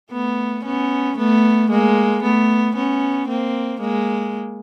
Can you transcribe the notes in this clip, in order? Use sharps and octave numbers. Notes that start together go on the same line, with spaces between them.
A3 B3
B3 C#4
A3 B3
G#3 A#3
A3 B3
B3 C#4
A#3 C4
G#3 A#3